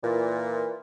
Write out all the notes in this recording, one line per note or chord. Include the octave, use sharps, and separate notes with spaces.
A#2 E3